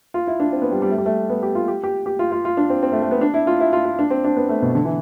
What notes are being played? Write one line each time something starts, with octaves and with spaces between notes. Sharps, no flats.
F4
E4
D4
C4
B3
G3
G3
A3
G3
A3
B3
G4
F4
G4
G4
G4
F4
F4
F4
D4
C4
C4
A3
A3
B3
D4
E4
F4
E4
F4
F4
D4
C4
D4
B3
A3
B2
D3
E3